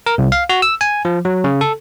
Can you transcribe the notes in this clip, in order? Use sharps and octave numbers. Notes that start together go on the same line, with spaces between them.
A#4
C2
F5
F#4
E6
G#5
F3
F#3
C#3
A4